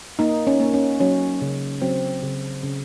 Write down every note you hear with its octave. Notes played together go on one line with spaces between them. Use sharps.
A#3 D#4
C#4
A#3
C#4
F#3 C#4
C#3
F#3 C4
C#3
C#3